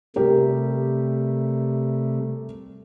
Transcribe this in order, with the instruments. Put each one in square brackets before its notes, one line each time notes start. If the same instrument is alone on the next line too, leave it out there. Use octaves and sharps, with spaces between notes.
[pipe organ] C3 G3 A3 [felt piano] G4 A#4